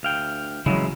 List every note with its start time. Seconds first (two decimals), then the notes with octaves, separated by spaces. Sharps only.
0.03 D2 F5 G5
0.66 C#3 E3 F#3 G#3 E4